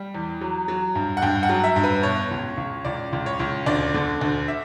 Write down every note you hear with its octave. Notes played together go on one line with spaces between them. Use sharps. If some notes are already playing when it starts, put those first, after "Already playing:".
Already playing: G3
E2
F#3
F#3
G2
F#5
G2 G5
F#5
F#3
E5
G2
B4
B2 C#5
C#2
C#2
C#2 D5
C#2
C#5
C#2
D2 D5
D3
D2
E5